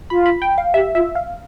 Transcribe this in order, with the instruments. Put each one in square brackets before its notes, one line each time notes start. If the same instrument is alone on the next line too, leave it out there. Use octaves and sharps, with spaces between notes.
[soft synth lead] F4 [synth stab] B5
[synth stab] B5
G5
F5
[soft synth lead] G4 [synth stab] E5
[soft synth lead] F4 [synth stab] E5
[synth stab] F5